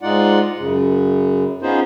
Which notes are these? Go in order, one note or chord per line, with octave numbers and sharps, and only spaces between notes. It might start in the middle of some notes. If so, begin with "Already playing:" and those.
G#2 G#3 D#4 F4 D5 F#5
F#2 C#3
B3 C#4 D#4 F4 G#4 C5